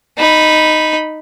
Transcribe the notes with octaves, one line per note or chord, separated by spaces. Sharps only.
D#4 B5